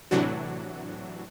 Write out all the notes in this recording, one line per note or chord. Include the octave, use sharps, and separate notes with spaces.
A2 C3 E3 F#3 D4 F#4